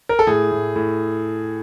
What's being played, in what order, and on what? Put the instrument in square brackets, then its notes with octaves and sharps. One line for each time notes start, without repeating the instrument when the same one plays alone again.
[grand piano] A#4
A4
A2 G#4
A2
A2